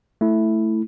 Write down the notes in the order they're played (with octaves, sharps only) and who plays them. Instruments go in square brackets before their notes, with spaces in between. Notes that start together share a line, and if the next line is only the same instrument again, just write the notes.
[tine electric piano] A3 E4